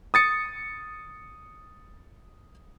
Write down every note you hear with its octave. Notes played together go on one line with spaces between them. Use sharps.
D#6 A6 C#7